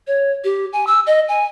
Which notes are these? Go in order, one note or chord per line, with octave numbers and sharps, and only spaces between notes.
C#5
G4
G#5
E6
D#5
G#5